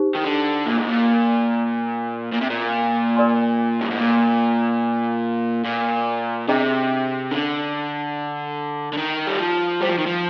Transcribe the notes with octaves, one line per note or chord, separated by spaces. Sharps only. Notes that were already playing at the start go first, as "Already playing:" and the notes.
Already playing: D#4 G4 C5
D#3
D3
A#2
G#2
A#2
A#2
C3
A#2
A#4 D5 G#5 C6
G2
G#2
A#2
A#2
C3 D4 G#4 D#5 G5 A#5
D3
D3
D#3
G3
F3
G3 C5 G5 A#5
F3
D#3
F3